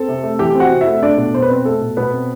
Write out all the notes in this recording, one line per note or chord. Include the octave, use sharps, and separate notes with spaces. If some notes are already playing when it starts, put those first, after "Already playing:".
Already playing: C4 A4
C3
A3
E3 G4 G5
C4
F#4 F#5
C3
E4 E5
A3
A3 D4 D5
B2
B2 C5
B4
C4 C5
A3 A4
B2
B2 B3 B4
C4